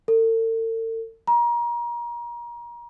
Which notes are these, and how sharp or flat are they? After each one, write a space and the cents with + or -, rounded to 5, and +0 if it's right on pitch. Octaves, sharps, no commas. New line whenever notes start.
A4 +45
A#5 +30